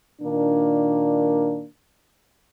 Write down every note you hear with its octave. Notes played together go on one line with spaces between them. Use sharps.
A#2 D#3 A#3 D4